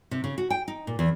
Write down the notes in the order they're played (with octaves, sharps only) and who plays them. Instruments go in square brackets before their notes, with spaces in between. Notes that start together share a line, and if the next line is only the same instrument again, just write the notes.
[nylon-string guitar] C3
C#3
F#4
G5
D#4
A#2
E2